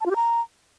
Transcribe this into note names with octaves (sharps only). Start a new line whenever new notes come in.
A5
F4
G4
A#5